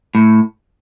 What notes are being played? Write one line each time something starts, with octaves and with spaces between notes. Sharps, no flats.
A2